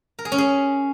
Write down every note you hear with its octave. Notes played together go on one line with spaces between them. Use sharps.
A#4
G#4
C#4
G#4